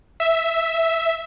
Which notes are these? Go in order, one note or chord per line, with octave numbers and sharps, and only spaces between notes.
E5